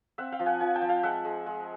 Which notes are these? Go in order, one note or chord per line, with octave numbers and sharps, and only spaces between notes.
C4 E5 F#5
F5 G5
F3
F#5 G#5
F3 F#5 G#5
G5 A5
F3
F5 G5
G#3 E5 F#5
G#3
G#3